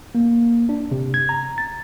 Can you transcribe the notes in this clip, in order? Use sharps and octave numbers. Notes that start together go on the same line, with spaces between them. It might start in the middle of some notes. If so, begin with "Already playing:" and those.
A#3
D4
C3
G#6
A#5
A6